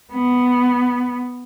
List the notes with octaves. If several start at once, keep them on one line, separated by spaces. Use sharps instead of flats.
B3